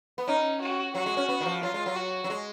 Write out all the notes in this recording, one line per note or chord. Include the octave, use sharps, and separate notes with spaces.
B3
C#4 D#4
F#4
F#3 F#4
G#3
C#4
B3
D#3
F3
F#3 F4
G#3
F#3
F#4
F#3
G#3